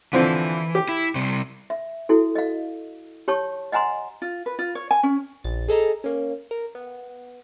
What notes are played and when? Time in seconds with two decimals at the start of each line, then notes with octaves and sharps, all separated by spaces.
0.13 D3 E3 F3 C4
0.75 G4
0.89 E4
1.15 C3 G3 C4
1.70 E5
2.09 E4 F#4 A4
2.35 D#5 F5
3.28 G4 C#5 A5 C#6
3.72 D#5 F#5 G#5 A#5 C6
4.22 F4
4.46 B4
4.59 F4
4.75 C#5
4.91 G#5
5.03 C#4
5.44 A#1 A6
5.68 G#4 A4 D#5 A#5
6.04 A#3 C#4
6.51 A#4
6.75 B3